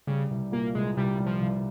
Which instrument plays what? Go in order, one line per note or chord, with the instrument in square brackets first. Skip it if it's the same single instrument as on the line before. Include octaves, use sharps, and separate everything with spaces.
[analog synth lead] C#3 [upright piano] G3
[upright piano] C2
[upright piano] A#2 [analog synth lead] A#3
[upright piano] C2 [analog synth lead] G#3
[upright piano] C2 [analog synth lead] G3
[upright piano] G3
[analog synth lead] F3
[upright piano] C2